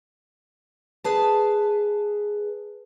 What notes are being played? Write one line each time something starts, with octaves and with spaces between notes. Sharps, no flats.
G#4 B4 A5